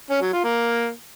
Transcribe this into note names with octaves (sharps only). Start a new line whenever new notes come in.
C#4
F#3
F4
A#3